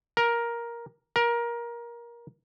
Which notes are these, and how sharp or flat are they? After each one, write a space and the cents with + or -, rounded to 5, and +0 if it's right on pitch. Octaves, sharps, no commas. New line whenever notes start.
A#4 +10
A#4 +20